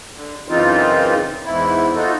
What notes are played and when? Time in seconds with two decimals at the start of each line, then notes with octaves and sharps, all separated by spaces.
0.14 D3
0.48 F#2 C#3 E3 C4 D#4 F4
1.45 E2 G#2 E4
1.95 D#4 F4 F#4 A4